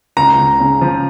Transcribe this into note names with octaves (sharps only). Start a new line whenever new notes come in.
C#2 A#5
C#2
C#3
F3